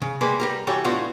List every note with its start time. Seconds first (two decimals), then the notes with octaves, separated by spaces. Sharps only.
0.02 C#3
0.21 G3 G#3 A#3 B4
0.40 G3 G4 A#4
0.67 E3 G3 F#4 G4 A4 C#5
0.84 A2 B3 D4 F4 F#4